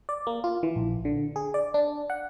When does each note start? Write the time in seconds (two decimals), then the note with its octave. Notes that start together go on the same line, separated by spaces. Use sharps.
0.09 D5
0.27 A#3
0.44 F4
0.63 E3
0.76 A#1
1.05 D3
1.36 G#4
1.54 D5
1.74 D4
2.10 F#5